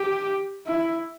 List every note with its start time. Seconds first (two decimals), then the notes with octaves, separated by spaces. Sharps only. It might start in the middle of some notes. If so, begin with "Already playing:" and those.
Already playing: G4
0.67 E4